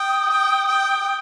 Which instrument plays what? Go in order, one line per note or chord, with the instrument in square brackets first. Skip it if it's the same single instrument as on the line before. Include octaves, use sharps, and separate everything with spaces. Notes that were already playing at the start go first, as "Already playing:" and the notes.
Already playing: [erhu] G5 [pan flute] D#6
[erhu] G5
G5